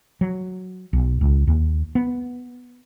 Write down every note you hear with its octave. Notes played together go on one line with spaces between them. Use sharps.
F#3
B1
C#2
D#2
B3